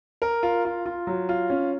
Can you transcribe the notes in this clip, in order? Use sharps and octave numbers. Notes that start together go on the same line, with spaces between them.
A#4
F4
F4
F4
F#3
F4
C#4